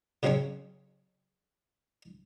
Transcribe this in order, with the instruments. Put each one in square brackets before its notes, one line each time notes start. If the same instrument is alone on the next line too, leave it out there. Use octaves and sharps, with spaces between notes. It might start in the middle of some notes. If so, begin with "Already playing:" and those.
[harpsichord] C#3 F#3 C4 C#4 C#5 C#6